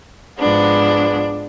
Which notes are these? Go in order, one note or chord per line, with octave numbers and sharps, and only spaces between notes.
G#2 F3 G#3 B3 D4